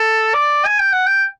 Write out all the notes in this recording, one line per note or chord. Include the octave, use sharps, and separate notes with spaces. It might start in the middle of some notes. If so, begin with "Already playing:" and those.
Already playing: A4
D5
G#5
G5
F#5
G5